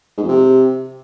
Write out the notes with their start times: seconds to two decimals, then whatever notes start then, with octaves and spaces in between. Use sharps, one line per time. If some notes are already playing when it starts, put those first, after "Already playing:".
0.18 G#2
0.23 F2
0.28 C3